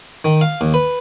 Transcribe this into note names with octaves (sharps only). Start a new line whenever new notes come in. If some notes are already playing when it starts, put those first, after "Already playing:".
D#3
F5
D#2
B4